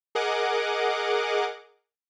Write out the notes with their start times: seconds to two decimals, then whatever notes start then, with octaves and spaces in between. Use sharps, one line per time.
0.15 G#4 A#4 D#5 F#5 D6